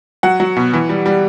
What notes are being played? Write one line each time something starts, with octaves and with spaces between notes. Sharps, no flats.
F#3 F#5
F#3
B2
E3
G3
G3